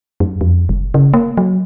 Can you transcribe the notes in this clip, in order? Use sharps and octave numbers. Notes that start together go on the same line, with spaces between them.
F#2
F2
F#1
C#3
A#3
F#3